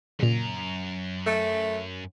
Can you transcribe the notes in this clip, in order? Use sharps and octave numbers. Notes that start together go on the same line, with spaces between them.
F#2 A#2 C#3 A#5
A3